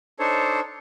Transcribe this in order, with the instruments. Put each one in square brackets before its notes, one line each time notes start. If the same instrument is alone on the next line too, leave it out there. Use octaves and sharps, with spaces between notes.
[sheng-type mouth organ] D4 D#4 A4 C5 C#5